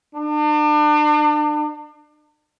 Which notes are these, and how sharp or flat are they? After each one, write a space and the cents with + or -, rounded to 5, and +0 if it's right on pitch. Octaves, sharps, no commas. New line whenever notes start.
D4 +35